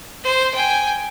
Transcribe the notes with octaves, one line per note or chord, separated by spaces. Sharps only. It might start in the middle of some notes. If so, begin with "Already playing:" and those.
C5
G5 G#5